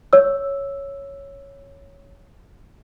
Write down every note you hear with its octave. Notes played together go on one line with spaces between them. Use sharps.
C#5 E6